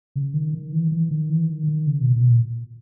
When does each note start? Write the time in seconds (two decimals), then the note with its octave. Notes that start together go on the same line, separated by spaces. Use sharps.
0.16 C#3
0.34 D#3
0.54 D#3
0.72 E3
0.92 E3
1.11 D#3
1.29 E3
1.49 D#3
1.67 D#3
1.87 C#3
2.01 B2
2.16 B2
2.29 A#2